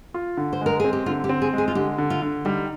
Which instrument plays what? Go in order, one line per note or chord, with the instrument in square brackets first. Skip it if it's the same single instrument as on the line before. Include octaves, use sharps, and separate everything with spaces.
[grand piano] F4
D3
[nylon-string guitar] C5
[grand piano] G#3 [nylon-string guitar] A#4
[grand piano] C4 [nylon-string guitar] G#4
[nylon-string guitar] G4
[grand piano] D3 [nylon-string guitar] F4
[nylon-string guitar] G4
[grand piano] C4
[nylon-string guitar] G#4
[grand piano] G#3 [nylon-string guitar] G#4
[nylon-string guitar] F4
[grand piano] D3 [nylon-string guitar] G4
[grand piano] D3
[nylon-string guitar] F4
[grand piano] D3
[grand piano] G3 [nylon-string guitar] D#4